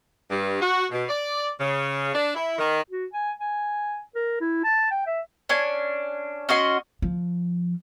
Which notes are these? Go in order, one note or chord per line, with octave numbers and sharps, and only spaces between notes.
G2
F#4
B2
D5
C#3
D4
E4
D#3
F#4
G#5
G#5
A#4
E4
A5
G5
E5
C#4 D4 G#5
C#4 F#4 D#5 C6
F3